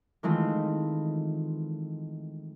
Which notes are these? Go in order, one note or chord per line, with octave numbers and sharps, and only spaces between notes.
D#3 E3 G#3 A3 C4 F4